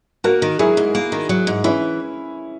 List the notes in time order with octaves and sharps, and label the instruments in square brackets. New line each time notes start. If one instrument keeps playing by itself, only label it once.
[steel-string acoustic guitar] A#3 [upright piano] F#4 A#4
[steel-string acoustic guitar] D#3
[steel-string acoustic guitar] F#3 [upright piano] E4 G#4
[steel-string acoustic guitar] G#2
A#3
D#3
F#3
G#2
[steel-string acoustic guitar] E3 [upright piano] C#4 E4